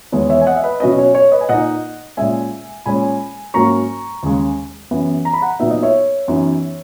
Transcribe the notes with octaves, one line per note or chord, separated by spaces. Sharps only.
E2 D#3 G#3 B3 E4 C#5
C#5 E5
G#5
D#5 F#5
E5
B4 D#5
B2 F#3 C#4 E4 B4 D#5
C#5
C#5
B4 D#5
G#5
A#2 A#3 D#4 D#5 F#5
A#2 G#3 C#4 E5 G#5
A#2 G#3 C#4 G#5 B5
G#2 F#3 A#3 C#4 A#5 C#6
D#2 C#3 G#3
F#2 E3 B3
A#5
B5
F#5 A#5
A#2 F#3 B3 D#4 E5
D#5
C#5 E5
F#2 E3 B3 D#4